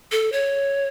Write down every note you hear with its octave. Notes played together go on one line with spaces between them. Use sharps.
A4
C#5